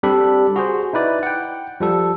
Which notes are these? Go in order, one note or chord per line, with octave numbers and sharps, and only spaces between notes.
G3 C4 D4 G4 A4 B5
F#4 G#4 C5
D#4 E4 B4 D5
F#5 G5
F3 G3 A4